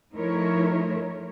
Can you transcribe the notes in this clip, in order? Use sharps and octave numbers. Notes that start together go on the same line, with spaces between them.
F3 A3 D#4 E4 A#4 C#5